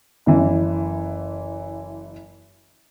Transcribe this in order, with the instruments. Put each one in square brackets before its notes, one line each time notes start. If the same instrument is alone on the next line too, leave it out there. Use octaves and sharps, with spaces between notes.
[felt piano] F#1 E3